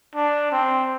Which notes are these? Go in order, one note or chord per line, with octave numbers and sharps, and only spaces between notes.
D4
C4